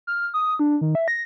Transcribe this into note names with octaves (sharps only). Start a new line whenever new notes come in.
F6
D#6
D4
D#3
E5
A#6